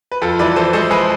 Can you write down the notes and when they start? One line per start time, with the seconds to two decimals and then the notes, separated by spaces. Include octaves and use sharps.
0.12 B4
0.22 F2 F4 A4
0.39 E3 B4 D5
0.56 E3 A4 C5
0.73 G#3 A4 C5
0.90 G#3 G#4 B4